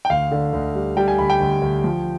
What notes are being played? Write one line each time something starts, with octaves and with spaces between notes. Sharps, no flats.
G5
D2 F5
D3
D2
G3
G3 G5
G#5
D2 B5
G5
D2
D2
F3